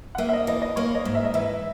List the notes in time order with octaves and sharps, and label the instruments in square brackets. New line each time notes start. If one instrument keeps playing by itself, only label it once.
[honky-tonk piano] F#5
[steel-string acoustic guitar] A#3 [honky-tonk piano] E5
[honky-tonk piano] E5
D#5
[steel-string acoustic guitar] E3 [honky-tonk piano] D#5
[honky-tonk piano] D#5
[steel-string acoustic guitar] A#3 [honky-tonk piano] C#5
[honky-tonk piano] D#5
[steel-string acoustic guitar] G#2
[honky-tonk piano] E5
D#5
[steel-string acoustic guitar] E3 [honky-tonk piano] E5